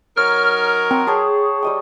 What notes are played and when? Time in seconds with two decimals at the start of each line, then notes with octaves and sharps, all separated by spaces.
0.17 F#3 D#4 A#4 C#5 F6
0.91 C4 F#5 A#5 C6
1.07 G#4 C#5 G5 A5
1.63 G3 D#5 G5